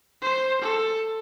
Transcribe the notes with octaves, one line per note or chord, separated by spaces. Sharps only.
C5
A4